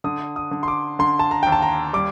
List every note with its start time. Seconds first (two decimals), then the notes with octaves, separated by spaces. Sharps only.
0.04 D3 D#6
0.36 D#6
0.51 D3
0.63 C6
0.68 D6
0.99 D3 C6
1.19 A5
1.31 A#5
1.43 D#2 G5
1.52 A5
1.62 A#5
1.93 G3 D6